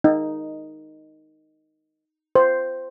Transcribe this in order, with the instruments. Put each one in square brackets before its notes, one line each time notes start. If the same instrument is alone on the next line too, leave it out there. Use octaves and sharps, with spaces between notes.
[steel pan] D#4
C5